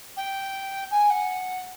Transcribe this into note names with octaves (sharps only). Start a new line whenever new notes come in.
G5
G#5
F#5